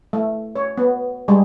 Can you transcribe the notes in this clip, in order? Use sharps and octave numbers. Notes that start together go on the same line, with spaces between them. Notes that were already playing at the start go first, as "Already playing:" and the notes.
A3
C#5
B3
G3 G#3